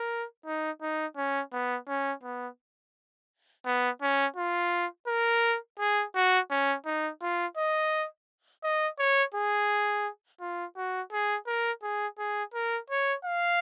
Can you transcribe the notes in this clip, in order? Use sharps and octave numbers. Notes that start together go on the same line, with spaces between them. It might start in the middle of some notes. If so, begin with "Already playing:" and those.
Already playing: A#4
D#4
D#4
C#4
B3
C#4
B3
B3
C#4
F4
A#4
G#4
F#4
C#4
D#4
F4
D#5
D#5
C#5
G#4
F4
F#4
G#4
A#4
G#4
G#4
A#4
C#5
F5